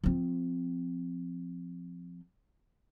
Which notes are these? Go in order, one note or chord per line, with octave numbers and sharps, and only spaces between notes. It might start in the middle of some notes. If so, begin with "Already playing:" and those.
F3 C4